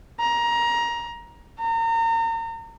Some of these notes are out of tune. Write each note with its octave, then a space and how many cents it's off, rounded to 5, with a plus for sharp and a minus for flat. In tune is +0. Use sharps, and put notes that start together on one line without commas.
A#5 +20
A#5 -35